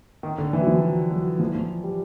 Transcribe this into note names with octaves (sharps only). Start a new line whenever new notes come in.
D#3
D3
E3
F#3
F3
F#3
F#3
F3
F3
G3